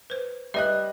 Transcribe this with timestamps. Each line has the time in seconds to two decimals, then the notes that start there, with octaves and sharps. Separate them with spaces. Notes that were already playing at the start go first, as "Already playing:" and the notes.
0.10 B4 C5
0.54 G3 B4 D#5 E5 F#6